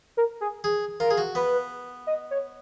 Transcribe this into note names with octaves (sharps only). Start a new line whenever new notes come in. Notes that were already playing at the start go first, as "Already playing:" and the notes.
A#4
G#4
G#4
F4 A#4
G#4
F#4
B3 B4
D#5
C#5